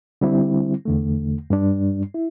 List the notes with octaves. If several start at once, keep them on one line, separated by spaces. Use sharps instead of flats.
D3 G3 C4 E4
E2 D3 A3
G2 G3 D4
E4